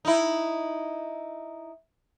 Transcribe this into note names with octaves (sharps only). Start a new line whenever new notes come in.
D#4 E4